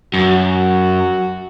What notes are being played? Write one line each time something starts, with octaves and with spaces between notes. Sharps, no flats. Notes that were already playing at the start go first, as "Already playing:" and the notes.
F#2 F#4